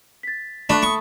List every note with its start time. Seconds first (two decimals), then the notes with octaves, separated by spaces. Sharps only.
0.23 A6 B6
0.69 A3 D4 B5 F#6
0.83 B5 C#6 D#6